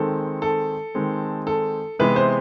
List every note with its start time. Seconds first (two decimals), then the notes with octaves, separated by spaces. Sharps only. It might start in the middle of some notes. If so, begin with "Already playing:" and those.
Already playing: D#3 G#3 C4 A4
0.42 A4
0.95 D#3 G#3 C4
1.47 A4
1.99 C3 E3 G#3 B3 B4
2.16 C5